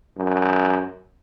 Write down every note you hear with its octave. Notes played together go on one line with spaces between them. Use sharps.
F#2